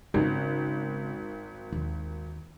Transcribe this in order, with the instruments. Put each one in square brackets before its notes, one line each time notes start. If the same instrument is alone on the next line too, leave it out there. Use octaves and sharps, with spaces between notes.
[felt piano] G#1 [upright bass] C#3
[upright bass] D#2